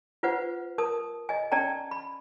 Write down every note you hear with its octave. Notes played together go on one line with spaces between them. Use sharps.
F4 B4 C5 F#5
A#4 A5 D#6
D#5 G#5
C#4 D5 G5 A5 A#5
B5